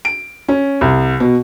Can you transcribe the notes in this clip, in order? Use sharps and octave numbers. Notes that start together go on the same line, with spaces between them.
D7
C#4
C2
B2